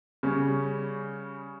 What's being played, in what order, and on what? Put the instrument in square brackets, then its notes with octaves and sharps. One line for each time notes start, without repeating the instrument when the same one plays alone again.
[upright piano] C#3 G3 C#4